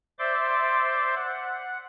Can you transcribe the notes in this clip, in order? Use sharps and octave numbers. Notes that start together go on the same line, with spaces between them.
C5 D5 E5 C6 D6
F#5